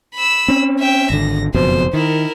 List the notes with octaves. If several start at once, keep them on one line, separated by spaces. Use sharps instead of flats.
B5 E6
C4 C#4
E5 G5
G#1 D3 A#6
F#1 F2 B2 C5
D#3 E4 A#4